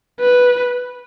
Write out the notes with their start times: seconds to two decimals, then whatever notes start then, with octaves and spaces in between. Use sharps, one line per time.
0.20 B4